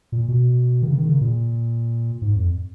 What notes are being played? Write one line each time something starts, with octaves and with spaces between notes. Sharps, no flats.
A#2
B2
D#3
C#3
D#3
C#3
A#2
G#2
F2